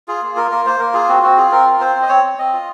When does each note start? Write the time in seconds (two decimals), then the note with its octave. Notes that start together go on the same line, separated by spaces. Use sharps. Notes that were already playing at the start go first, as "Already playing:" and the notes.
0.08 F4 G#4
0.22 A#3
0.36 F4 A#4
0.51 A#3 A#4
0.66 A#3 C5
0.79 A#3 A#4
0.94 F4 G#4
1.08 C4 F#4
1.23 C4 F#4
1.37 F4 G#4
1.51 C4 A#4
1.66 F4
1.80 C4 C5
1.96 C4
2.02 D#5
2.09 C4 C#5
2.23 C4
2.38 C4 D#5
2.53 F4